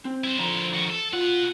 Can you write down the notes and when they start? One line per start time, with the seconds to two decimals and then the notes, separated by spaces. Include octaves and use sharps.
0.05 C4
0.24 E4 C5
0.39 D3 F3 A#5
0.74 D#3 F#4
0.90 A4
1.13 B2 F4 F#5